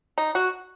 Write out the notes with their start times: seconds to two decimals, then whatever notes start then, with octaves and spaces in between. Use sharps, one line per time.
0.18 D#4
0.35 F#4